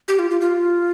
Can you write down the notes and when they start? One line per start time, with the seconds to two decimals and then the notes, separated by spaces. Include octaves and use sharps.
0.08 G4
0.19 F4
0.30 F4
0.41 F4